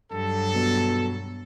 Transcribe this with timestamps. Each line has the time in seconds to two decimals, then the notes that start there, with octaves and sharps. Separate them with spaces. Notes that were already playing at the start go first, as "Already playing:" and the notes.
0.12 G2 F#3 A4
0.55 B2